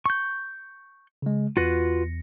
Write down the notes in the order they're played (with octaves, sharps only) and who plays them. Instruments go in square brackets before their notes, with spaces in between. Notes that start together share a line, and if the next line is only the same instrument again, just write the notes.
[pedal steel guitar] C#6 G6
[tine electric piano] C#3 G#3
[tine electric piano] E2 A#6 C#7 [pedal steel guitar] F4 F#4 B4